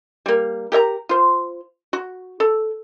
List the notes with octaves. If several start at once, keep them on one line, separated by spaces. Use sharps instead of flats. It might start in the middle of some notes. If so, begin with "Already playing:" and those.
G3 A#3
G4 A#4 E5 A#5
F4 C5
F#4
A4